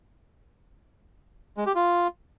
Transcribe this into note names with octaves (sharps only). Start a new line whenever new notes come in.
G#3
G4
F4